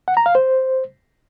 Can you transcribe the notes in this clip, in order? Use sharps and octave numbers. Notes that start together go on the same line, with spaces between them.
F#5
A#5
F5
C5